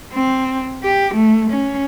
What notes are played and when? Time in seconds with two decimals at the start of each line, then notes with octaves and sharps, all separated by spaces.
0.13 C4
0.84 G4
1.14 A3
1.51 C#4